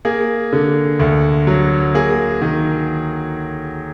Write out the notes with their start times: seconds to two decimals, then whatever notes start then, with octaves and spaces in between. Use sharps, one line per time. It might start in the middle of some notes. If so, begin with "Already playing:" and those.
0.05 A#3 G#4
0.53 D3
1.00 D2
1.47 F#3
1.94 A#3 G#4
2.42 D#3